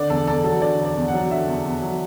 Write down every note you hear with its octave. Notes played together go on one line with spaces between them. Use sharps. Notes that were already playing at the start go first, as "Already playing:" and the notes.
Already playing: D3 D5
E2 A4
E2 A4
F#3 A4
D3 D5
E2
D5
E2
F#5
F#3
D3 E5
E2
E2
F#3